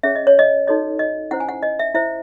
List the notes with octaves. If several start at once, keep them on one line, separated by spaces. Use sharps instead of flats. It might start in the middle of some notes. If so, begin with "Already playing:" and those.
C#4 G#4 C#5 E5
D#5
C#5
D#5
D#4 F#4 A4 C#5 D#5
D#5
C#4 E4 C5 F#5
G#5
F#5
D#5
E5
E4 C5 E5